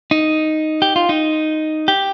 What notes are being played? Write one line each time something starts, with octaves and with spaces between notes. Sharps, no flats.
D#4
G4
F4
D#4
G4